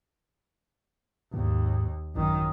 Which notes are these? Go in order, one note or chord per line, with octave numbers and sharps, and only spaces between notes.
D#2 G#2
A1 F#2 D#3